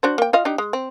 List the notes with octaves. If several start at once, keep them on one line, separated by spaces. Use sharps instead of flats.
D4 F#4 C5
A#3 G5
F4 D#5 F5
D4 D#4 G4
G#3
C4